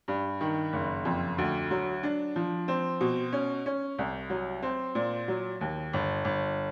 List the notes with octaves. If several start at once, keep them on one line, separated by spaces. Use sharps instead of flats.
G2
D#3
F#1
F2
D2
F#3
D4
F3
C4
B2
C#4
C#4
C2
F#3
C4
A#2
F#3
D#2
G1
G1